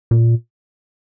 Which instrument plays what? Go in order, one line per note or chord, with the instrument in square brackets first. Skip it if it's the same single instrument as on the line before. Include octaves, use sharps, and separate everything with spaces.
[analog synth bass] A#2